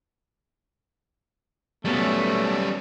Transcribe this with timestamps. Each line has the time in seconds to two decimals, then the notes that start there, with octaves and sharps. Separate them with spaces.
1.85 F#3 G3 A3 B3 C#4